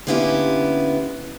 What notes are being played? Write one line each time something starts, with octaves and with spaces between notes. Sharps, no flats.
D3 A#3 B3 C#4 E4 G4